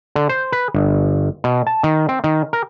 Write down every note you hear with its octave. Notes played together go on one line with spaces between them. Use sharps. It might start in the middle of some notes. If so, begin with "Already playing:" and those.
D3
C5
B4
G1
B2
A5
D#3
C4
D#3
A#4